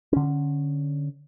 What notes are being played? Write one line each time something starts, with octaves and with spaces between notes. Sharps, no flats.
D3 C#4